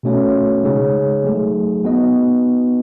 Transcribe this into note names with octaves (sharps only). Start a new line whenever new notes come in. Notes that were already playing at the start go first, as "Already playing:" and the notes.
B2 A3 C#4 F#4 C#5
C#3 G#3 D#4 G#4 C#5
F#3 A3 D#4 G#4
B3 D#4 F#4 B4 D#5